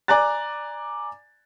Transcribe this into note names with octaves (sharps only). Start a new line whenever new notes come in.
D5 G#5 A#5 F#6 A6